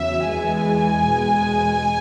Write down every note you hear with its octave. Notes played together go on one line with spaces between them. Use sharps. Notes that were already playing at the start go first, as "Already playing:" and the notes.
Already playing: E2 C#3 F#3 E5
E2 E3 G#3 G#5
E2 B2 G#3